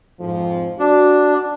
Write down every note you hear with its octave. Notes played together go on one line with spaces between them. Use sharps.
F2 G#2 F3
D4 F#4